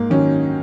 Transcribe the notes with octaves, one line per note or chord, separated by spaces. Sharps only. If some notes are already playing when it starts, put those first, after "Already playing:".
Already playing: G#2 A#3
D#3 F#3 C#4